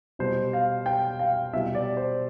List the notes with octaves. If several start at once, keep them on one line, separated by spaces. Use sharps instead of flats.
B2 G3 C5
F5
G5
F5
B2 G3 E5
D5
C5